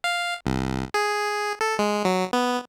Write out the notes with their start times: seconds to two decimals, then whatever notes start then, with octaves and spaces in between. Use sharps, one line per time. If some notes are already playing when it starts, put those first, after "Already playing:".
0.04 F5
0.46 C2
0.94 G#4
1.61 A4
1.79 G#3
2.05 F#3
2.33 B3